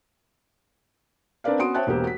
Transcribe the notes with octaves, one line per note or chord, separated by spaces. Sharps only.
C4 D4 A#4 B4 D5 F5
B3 C#4 F#4 C6 D#6 D7
C5 C#5 E5 G5 A5 F#6
E1 A#3 B3 G4 C5
F#4 B6